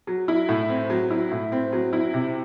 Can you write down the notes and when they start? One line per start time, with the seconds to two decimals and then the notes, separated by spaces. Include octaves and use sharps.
0.07 F#3
0.28 E4
0.49 A2
0.69 C4
0.90 F#3
1.11 E4
1.32 A2
1.52 C4
1.73 F#3
1.93 E4
2.14 C3